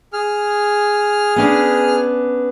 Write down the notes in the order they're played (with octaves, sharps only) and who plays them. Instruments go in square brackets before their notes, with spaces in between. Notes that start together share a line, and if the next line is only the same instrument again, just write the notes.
[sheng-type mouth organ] G#4 F6
[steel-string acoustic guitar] B3 C#4 D4